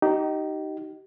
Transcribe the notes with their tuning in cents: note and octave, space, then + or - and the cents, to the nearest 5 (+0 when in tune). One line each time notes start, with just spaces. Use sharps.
D#4 +0 G4 -30